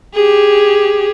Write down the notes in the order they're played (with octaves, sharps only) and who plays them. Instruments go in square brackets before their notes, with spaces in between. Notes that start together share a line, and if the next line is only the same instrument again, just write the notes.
[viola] G4 G#4